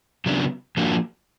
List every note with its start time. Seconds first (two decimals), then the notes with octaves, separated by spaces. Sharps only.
0.26 C#3 F#3 B3 D4
0.77 F3 A#3 D4 F#4